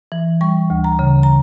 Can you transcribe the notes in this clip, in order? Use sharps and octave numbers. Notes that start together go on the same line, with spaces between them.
E3
G3 C#6
D2
A#5
C#3
A#5